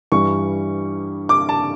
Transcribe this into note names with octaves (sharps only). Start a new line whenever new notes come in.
G2 E3 G3 C#6
D6
A5